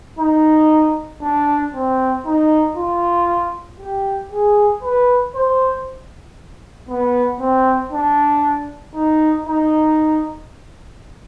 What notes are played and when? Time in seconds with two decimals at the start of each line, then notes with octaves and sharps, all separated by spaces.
0.19 D#4
1.22 D4
1.74 C4
2.26 D#4
2.77 F4
3.80 G4
4.32 G#4
4.83 B4
5.35 C5
6.89 B3
7.40 C4
7.92 D4
8.95 D#4
9.47 D#4